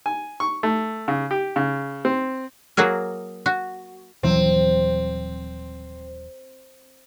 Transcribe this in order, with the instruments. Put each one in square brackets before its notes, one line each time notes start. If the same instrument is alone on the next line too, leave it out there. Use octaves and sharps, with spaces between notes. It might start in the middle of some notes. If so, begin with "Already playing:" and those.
[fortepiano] G#5
C#6
A3
C#3
G4
C#3
C4
[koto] F#3 A#3 F#4 G#4 A#4
F#4
[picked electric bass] D#1 E3 F#3 [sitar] C4